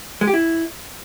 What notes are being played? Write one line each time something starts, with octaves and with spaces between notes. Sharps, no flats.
G#3
G4
E4